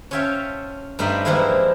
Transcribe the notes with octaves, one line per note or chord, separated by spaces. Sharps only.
C#4 F4 C#5 E5 G5 A5
G2 A3 D4 D#4 C5 D#5
E3 F3 G3 G#3 A#3 E4